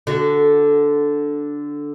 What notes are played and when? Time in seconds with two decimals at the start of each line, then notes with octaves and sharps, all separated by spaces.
0.07 D3 F#4